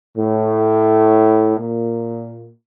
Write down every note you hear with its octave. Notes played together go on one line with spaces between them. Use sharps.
A2
A#2